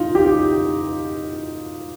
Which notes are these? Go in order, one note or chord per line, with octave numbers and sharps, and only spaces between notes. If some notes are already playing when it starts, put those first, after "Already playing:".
Already playing: D#4 F4
G4